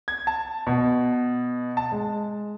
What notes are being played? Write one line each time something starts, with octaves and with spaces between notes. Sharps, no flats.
G#6
A5
B2
A5
G#3